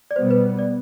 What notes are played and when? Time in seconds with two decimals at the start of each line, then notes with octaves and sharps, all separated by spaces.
0.11 D5
0.16 B2 G3 B3 C5
0.31 B4
0.59 D5